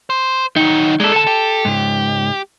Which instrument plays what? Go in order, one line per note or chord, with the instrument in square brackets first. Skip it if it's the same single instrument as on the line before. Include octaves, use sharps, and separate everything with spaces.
[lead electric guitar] C5
[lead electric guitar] D#3 F#3 [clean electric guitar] D#4
[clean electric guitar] G#3 A4 [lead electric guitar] D#4 D5
[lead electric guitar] D3 [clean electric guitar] A4 A5
[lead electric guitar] G4
[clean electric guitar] C#2 G#2